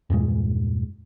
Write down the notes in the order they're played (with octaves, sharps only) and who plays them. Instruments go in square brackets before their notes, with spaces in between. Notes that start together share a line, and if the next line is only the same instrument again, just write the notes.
[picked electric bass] E2 G2 A#2 G#3